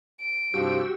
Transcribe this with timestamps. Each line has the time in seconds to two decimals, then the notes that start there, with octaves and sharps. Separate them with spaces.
0.20 D7
0.54 C2 G2 F3 F#4 G4 E6